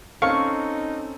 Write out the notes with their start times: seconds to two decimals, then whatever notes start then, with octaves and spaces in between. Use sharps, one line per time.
0.22 C4 C#4 D#4 A4 F5 C#6